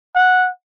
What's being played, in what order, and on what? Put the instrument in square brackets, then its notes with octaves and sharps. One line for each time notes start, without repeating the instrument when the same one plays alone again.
[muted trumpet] F#5